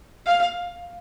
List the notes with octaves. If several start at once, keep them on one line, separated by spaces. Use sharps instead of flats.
F5